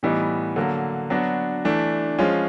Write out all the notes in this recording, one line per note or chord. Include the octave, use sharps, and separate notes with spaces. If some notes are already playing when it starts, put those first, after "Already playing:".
A2 E3 G3 B3 D#4
D3 F#3 A#3
F#3 B3 D4 F#4
E3 A3 D4
F3 G#3 C#4 F4